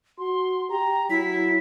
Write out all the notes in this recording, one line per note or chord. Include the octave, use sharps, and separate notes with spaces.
F#4 C6
G4 A#5
F#3 E4 B6